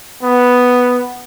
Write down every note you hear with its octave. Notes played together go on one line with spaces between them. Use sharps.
B3